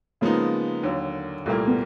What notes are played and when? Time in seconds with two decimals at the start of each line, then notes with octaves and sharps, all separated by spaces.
0.21 C#3 F3 G#3 A#3 B3 D#4
0.83 D#2 D3 F#3
1.45 C2 A#2 G3 A3 A#3
1.67 B3